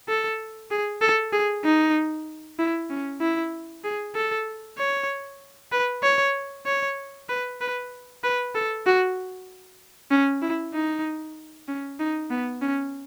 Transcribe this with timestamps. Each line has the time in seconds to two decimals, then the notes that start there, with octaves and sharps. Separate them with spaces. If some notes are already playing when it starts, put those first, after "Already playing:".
0.08 A4
0.71 G#4
1.01 A4
1.33 G#4
1.65 D#4
2.59 E4
2.90 C#4
3.21 E4
3.84 G#4
4.15 A4
4.78 C#5
5.72 B4
6.03 C#5
6.66 C#5
7.29 B4
7.61 B4
8.24 B4
8.55 A4
8.86 F#4
10.11 C#4
10.42 E4
10.74 D#4
11.68 C#4
11.99 D#4
12.31 B3
12.62 C#4